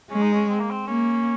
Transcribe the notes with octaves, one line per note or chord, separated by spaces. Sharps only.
G#3 C#4
D#4
C#4
C4
A#3
C4
A#3 C#4